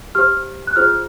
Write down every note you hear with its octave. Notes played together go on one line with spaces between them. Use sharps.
G4 C5 F6
F#6
F4 G#4 C5 F6